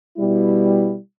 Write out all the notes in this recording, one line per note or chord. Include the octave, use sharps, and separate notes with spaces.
B2 G3 E4